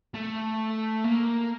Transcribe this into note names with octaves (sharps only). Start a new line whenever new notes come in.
A3
A#3